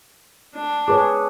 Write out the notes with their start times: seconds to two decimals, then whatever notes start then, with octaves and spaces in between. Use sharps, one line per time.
0.55 D4
0.88 G#4 B4 C#5 A5 D6